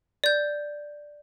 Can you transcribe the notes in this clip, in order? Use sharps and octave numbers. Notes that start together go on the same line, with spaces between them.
D5 G6